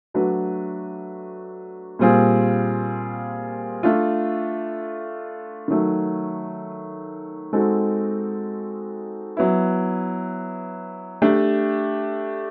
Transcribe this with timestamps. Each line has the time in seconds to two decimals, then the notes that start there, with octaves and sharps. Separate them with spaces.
0.14 F#3 A3 D4 F#4 B4
1.99 A#2 G3 C4 F4 G#4
3.83 A3 D4 F4
5.68 D#3 F#3 A3
7.53 G#3 C4 D#4 F#4 A4
9.37 F#3 B3 E4
11.22 A3 D4 G4